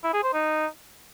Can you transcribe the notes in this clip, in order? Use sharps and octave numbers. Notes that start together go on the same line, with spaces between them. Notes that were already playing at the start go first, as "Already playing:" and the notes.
E4
G#4
C5
D#4